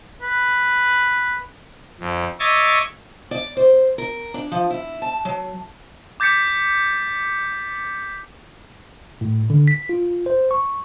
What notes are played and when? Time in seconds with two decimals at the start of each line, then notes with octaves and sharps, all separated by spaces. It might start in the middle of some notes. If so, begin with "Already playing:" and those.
0.22 B4
2.00 F2
2.40 C#5 D#5 E5 C#6 D6 A6
3.31 D5
3.57 C5
3.98 A#4
4.34 D4
4.52 F3
4.70 E4
5.02 A5
5.25 F#3
6.20 D6 G6 A6 B6 C#7
9.21 A2
9.50 D3
9.68 B6
9.89 F4
10.26 C5
10.51 C#6